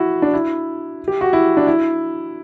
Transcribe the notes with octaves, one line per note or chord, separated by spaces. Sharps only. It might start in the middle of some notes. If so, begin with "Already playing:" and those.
Already playing: E4 F#4
D4
E4
G4
F#4
E4
D4
E4